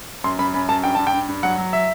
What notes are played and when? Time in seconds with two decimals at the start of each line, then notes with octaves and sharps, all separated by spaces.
0.24 F#2 C6
0.39 F#2 B5
0.54 F#2 B5
0.69 F#2 A5
0.84 G2 G5
0.95 G2 A5
1.07 G5
1.13 G2
1.28 G2
1.43 F#3 F#5
1.58 F#3
1.73 E5